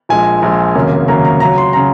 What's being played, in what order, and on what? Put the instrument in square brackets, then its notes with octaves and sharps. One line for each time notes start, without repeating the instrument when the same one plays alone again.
[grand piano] A#1 A#2 G#3 G#5
A#1 A#2 G#3
F1 D#2 C#3 F#3 A#3
F1 D#2 C#3 F#3 A#3 A#5
A#5
C#2 C#3 F#3 A#5
C6
C#3 F#3 A#5